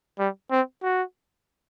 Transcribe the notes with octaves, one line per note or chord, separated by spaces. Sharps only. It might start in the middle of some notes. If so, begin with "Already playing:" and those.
G3
C4
F#4